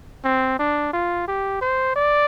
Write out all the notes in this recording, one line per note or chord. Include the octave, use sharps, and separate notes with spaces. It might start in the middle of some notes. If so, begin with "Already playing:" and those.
C4
D4
F4
G4
C5
D5